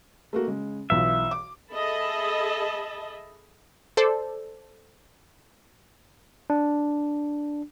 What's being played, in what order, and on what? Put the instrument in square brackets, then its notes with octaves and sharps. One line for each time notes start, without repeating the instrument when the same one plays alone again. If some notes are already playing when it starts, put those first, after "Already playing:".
[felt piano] A3 A#3 F#4
C#3 G#3
[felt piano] B1 E3 F4 [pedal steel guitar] E5
[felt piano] D6
[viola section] G#4 A4 D#5 E5 A5 B5
[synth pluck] A4 C5 D5
[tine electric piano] D4